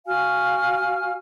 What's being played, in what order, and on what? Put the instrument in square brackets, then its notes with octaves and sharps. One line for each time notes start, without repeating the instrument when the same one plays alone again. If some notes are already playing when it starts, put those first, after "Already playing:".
[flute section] F#4 F5 G#5 F6